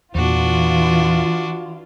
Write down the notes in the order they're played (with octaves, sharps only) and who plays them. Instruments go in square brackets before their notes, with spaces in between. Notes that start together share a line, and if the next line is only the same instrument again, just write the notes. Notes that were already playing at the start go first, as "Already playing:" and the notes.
[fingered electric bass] E2 A#2 [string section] E3 F4 [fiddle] D4 F#4